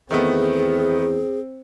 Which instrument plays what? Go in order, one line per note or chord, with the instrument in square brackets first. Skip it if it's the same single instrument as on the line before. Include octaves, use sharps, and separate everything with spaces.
[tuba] E2 [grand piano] D#3 A3 B3 [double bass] C4 [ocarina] G#4